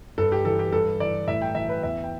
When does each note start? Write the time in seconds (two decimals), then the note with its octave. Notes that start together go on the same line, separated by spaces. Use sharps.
0.18 G2 A4
0.32 G4
0.45 E3 A4
0.59 G4
0.72 G2 A4
1.00 E3 D5
1.27 A2 E5
1.42 G5
1.55 E3 E5
1.69 B4
1.83 E2 E5
2.04 G5